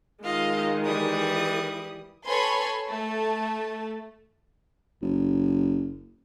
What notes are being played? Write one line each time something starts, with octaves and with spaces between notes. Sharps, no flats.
D#3 G#3 F4 D#5 F5
E3 G3 D#6
A4 B4 C#5 G#5 B5 C6
A3 A5
F#1